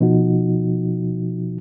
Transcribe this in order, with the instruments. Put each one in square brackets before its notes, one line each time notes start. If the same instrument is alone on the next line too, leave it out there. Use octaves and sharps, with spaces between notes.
[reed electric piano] B2 F3 D#4 F#4